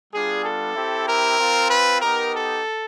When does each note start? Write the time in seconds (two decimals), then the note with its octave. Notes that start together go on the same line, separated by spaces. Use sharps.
0.13 G3 B3 D4 F4 G#4
0.44 A4
0.76 C4 E4 G4
1.07 A#4
1.39 C4 F4
1.70 B4
2.01 B3 D#4 G4 A#4
2.34 A4